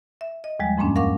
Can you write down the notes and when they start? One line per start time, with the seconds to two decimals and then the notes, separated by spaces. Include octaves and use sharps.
0.21 E5
0.44 D#5
0.60 D#2 F3 G3 G#3
0.77 F2 G#2 A#3 C#4 D4
0.96 A#4 F5 F#5 C#6 D6